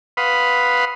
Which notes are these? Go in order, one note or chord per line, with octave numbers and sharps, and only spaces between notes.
B4 F5 F#5 B5 C6 D#6